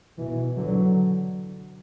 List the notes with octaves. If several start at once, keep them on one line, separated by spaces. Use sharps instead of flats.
B2 E3
D3 F#3